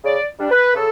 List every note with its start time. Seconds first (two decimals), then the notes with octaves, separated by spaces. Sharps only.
0.04 C#3 D5
0.39 G3 D4
0.51 B4
0.75 C#3 A4